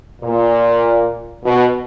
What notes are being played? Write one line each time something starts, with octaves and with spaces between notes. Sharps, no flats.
A#2
B2